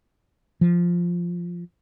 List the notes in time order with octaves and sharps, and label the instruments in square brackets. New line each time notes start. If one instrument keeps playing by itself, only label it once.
[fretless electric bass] F3